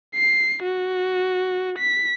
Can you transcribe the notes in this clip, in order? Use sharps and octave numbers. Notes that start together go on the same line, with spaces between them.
C7
F#4
B6